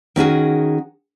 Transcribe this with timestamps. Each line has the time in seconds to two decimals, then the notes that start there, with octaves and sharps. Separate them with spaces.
0.16 D#3 C#4 F#4 G#4